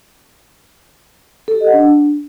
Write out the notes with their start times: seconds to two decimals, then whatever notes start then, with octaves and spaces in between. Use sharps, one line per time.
1.48 A4
1.54 G4
1.61 D#5
1.67 F#5
1.73 D4